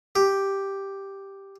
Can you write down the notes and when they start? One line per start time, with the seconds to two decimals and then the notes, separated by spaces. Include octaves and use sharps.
0.16 G4